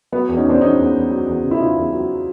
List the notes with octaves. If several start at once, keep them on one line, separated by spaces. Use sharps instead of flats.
F#3 B3
E2
C#4 D#4
E2 C4 D4
E2 C#4 D#4
E2
E2
F#3
E2
C#3
E4
C#3 D#4 F4
E2
F#3